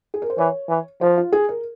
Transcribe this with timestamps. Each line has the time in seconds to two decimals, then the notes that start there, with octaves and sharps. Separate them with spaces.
0.14 G#4
0.22 A#4
0.30 C5
0.38 E3 C#5
0.69 E3
1.01 F3 C5
1.18 F4
1.32 G#4
1.49 A#4